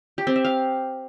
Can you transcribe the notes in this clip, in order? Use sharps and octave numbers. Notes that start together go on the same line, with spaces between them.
G4
C4
E5
F5